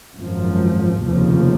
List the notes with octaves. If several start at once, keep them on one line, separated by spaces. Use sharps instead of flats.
G#1 F#2 F3
F1 D#2 C#3 F3